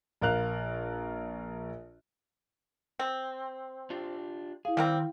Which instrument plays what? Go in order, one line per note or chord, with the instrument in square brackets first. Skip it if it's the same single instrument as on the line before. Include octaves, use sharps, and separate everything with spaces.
[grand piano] A#1 A#4 F5 F#6 F7
[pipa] C4
[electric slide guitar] D4 F4 G4
[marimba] E4 F5 [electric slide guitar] G#4
[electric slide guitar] D#3 [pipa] G3 A#3 C4 [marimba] G5